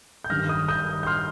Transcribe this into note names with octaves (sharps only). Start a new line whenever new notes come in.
G6
G2 D#3 G3 F6 A#6
D#6 G6
D#6 G6
G6
C6 F6